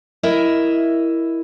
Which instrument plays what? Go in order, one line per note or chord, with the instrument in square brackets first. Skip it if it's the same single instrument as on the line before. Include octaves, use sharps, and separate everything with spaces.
[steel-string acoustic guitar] E4 A#4 D#5 E5